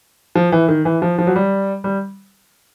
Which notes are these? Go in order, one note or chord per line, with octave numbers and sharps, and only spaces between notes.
F3
E3
D#3
E3
F3
F3
F#3
G3
G3